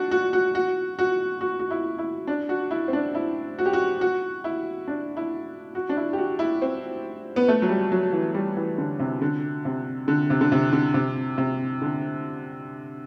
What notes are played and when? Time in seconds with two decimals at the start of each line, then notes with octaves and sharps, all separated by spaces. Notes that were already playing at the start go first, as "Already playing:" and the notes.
Already playing: D4 F#4
0.11 F#4
0.33 F#4
0.55 F#4
0.99 F#4
1.41 F#4
1.59 F#4
1.71 E4
1.98 E4
2.27 D4
2.49 F#4
2.71 E4
2.88 C4
2.93 D4
3.15 E4
3.59 F#4
3.66 G4
3.73 F#4
4.01 F#4
4.44 E4
4.88 D4
5.17 E4
5.75 F#4
5.89 D4
5.97 E4
6.13 G4
6.18 F#4
6.39 E4
6.62 C4
7.36 B3
7.48 A3
7.62 F#3
7.69 G3
7.92 F#3
8.13 E3
8.34 G3
8.57 E3
8.78 D3
8.99 C3
9.22 D3
9.65 C3
10.08 D3
10.30 C3
10.41 D3
10.52 C3
10.73 D3
10.94 C3
11.38 C3
11.82 D3